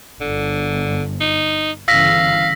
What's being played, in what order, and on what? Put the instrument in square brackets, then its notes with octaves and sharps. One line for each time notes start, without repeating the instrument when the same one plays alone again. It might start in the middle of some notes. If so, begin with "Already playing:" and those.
[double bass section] G1 [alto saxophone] D3
[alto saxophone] D#4
[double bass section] G1 C#3 E3 [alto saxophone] F5 [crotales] E6 A#6 B6